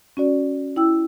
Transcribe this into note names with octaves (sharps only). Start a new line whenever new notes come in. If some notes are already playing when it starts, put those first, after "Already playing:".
C#4 F#4 D5
E4 G5 E6